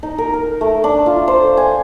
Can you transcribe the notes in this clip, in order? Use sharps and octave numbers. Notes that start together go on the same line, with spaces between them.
D#4
A#4
A#4
A3
D4
F4
C5
G#5